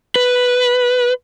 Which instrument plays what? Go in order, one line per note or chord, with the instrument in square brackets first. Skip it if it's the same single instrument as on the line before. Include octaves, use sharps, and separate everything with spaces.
[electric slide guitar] B4